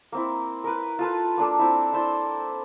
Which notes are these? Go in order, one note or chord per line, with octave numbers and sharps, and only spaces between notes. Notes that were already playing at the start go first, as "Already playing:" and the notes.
A#3 C4 E4
A#4 B4
F4 A4 B4
A#3 D4 A4
C4 E4
E4 C5 D5